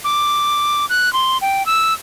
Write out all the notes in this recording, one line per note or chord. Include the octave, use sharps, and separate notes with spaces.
D6
F#6
C6
G5
E6